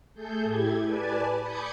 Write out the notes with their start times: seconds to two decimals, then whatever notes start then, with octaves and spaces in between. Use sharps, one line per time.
0.14 A3 G#4 A4 G6
0.43 A2 E4 G4 G#6
0.84 B4 D5 G#5 A5
1.41 B5 D6 D#6 G6 G#6 C#7